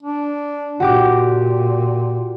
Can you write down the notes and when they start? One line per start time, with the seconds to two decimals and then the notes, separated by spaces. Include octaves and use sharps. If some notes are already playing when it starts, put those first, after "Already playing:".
0.03 D4
0.80 A#2 F#4 G4 D6